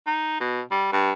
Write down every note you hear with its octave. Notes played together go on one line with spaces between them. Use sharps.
D#4
B2
G3
G2